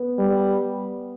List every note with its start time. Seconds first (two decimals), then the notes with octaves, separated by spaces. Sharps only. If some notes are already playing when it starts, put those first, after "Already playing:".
Already playing: B3
0.19 G3